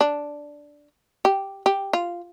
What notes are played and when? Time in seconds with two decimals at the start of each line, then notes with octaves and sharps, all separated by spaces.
0.01 D4
1.25 G4
1.66 G4
1.93 F4